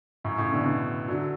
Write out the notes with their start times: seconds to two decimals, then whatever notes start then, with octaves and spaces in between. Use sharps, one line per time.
0.24 F#2 A2
0.38 A2 C#3
0.52 B2 D3
0.66 B2 D3
1.08 D3 F#3